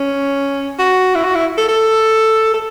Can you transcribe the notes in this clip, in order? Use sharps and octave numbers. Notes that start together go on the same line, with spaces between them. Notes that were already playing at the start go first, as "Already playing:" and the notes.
Already playing: C#4
F#4
E4
F#4
E4
A4
A4
A4